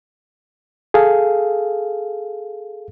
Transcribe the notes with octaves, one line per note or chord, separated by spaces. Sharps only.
G#4 A4 F5